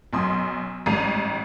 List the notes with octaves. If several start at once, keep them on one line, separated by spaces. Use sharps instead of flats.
B1 F#2 C6 D#6
A1 G#2 G3 A#5 C7 D#7